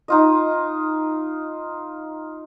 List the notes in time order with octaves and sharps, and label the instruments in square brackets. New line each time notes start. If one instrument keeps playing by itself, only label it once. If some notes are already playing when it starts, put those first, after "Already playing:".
[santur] D#4 F4 D#5